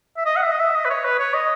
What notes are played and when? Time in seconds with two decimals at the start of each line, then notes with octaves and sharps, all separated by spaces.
0.17 E5
0.26 D#5
0.36 F#5
0.43 E5
0.52 D#5
0.60 E5
0.75 D#5
0.85 B4
0.90 C#5
1.05 B4
1.19 C#5
1.34 D#5